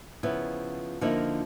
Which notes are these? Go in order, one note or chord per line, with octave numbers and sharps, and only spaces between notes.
C#3 F3 B3 E4
D3 F3 A#3 D#4 E4